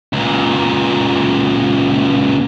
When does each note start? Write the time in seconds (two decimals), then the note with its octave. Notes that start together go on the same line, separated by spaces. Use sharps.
0.13 C#2 A#2